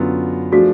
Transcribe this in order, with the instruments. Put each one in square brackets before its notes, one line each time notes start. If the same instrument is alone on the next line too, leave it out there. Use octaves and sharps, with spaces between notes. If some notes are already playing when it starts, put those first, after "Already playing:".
Already playing: [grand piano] F#2 D3 F#3 B3 F4
[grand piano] F3 A3 D4 G#4 [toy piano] F#4